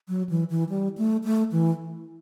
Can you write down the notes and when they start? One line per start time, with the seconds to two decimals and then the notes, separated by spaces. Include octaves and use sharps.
0.09 F#3
0.29 E3
0.50 E3
0.69 G3
0.98 A3
1.24 A3
1.52 E3